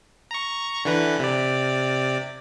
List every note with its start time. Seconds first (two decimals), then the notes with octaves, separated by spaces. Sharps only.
0.31 A#5 C#6
0.85 D3 E3 B4
1.19 C3 D5